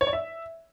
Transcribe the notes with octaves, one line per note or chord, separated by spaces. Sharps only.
C#5
D5
E5